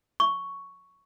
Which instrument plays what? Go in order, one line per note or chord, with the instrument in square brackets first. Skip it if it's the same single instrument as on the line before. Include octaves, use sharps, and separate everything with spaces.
[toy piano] C#6